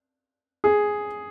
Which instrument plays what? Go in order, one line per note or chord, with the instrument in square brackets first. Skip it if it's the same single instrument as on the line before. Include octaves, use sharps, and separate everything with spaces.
[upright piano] G#4